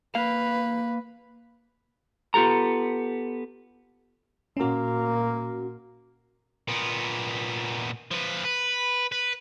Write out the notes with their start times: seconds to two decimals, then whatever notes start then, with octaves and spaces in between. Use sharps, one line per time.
0.15 A#3 B4 F5
2.34 B3 F4 G4 A4 A#5
4.57 A#2 A#3 C#4 F#4
6.68 A#2 B3
8.11 F3 B4
8.45 B4
9.12 B4